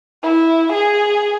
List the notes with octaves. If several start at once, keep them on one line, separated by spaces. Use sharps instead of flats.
E4
G#4